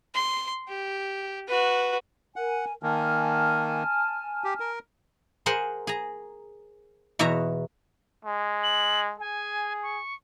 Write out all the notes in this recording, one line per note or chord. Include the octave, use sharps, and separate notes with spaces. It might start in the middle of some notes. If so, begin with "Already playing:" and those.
C6
G4
F#4 B4
A#4 F#5 G#5
D#3 A#3 G#5 A5 F6
G4
A#4
G#4 A#4 C5 F#5 G#5
G#4 A#5
E2 B2 F#4 C#5 E5 A#5
G#3
F#7
G#4 G#5
C#6